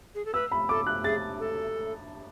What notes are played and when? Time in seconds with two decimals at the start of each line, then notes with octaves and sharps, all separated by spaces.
0.15 G#4
0.25 A4
0.34 B4 E6
0.52 B5
0.69 A4 D6
0.86 F#6
1.04 G#4 A6
1.40 A4